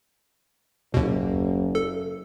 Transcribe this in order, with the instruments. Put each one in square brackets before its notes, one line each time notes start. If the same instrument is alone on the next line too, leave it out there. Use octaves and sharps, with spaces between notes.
[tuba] F#1 [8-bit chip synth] D#2 B2
[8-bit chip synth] A4